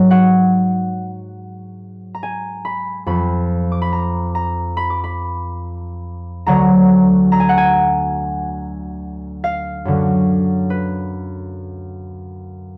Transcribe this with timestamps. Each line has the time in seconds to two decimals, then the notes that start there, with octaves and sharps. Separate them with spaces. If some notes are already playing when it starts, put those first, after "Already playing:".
Already playing: G#2 F#3
0.11 F#5
2.15 A#5
2.23 G#5
2.65 B5
3.06 F2 F3 B5
3.72 D6
3.82 B5
3.93 A#5
4.35 A#5
4.77 B5
4.90 D6
5.04 B5
6.46 D2 D3 F#3 A#5
7.32 A#5
7.40 G#5
7.49 F#5
7.58 G#5
9.44 F5
9.85 F#2 D3 F#3
10.70 B4